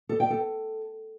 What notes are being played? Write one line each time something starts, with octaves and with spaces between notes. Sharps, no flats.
A4
G5
A4